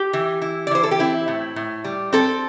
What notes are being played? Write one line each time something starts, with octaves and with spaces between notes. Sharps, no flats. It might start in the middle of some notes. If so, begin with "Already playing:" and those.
Already playing: G4
E3
E4
D5
E3 C5
A4
G4
C4 E4
A2
A2
G3
C4 A4